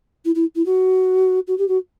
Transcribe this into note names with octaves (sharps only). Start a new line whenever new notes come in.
E4
E4
E4
F#4
F#4
G4
F#4